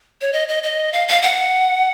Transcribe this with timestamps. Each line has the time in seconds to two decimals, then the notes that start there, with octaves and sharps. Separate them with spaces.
0.21 C#5
0.33 D#5
0.48 D#5
0.63 D#5
0.93 F5
1.08 F5
1.22 F#5